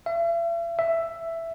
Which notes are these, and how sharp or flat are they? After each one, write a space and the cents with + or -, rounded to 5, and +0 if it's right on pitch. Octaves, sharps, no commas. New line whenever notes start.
E5 +45
E5 +10